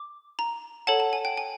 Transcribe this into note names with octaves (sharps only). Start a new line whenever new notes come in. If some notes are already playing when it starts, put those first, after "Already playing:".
Already playing: D6
A#5
A4 C#5 F#5 A5
A5
G#5
G5
G#5